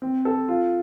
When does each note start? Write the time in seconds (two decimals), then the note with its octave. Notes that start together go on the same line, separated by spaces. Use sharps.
0.02 C4
0.25 A4
0.48 F4